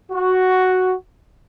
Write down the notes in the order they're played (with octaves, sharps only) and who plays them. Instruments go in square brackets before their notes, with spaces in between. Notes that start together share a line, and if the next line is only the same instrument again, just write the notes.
[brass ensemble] F#4